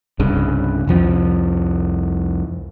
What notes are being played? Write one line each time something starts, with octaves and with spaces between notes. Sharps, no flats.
C2 G2 C#3
C2 F2 F3